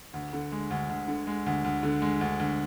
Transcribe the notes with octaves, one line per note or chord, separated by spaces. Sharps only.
D2
D3
G#3
D2
D2
D3
G#3
D2
D2
D3
G#3
D2
D2